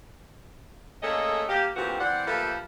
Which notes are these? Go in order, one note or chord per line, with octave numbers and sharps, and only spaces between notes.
A3 A#3 C#4 G#4 A4 D#5
A#3 G4
D2 A#2 E3 C4 F#4 G4
E3 C4 D5 F#5
F3 G3 A3 A#3 A4 B4